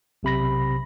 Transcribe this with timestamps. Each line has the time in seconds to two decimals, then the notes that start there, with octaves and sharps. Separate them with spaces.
0.23 B1 C3 B5 A#6